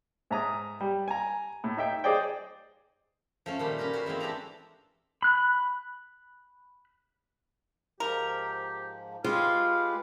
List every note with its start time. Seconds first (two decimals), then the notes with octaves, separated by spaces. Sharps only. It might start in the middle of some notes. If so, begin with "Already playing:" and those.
0.31 G#2 E5 A#5 D#6
0.81 G3
1.08 G#5 A#5
1.64 A2
1.77 D#4 E5 G5
2.04 G#4 C5 D5 D#5 G5
3.46 F3 A3 C#4
3.59 A#2 D#3 G3
3.78 C#4 G4 A#4 B4
3.94 F#4 B4 C5
4.06 E3 G#3 A#3 C4
4.20 D4 G4 A4 D5 A#5
5.22 B5 F#6
8.00 G#2 F3 G4 A#4
9.24 G#3 F4 G4 B4 F5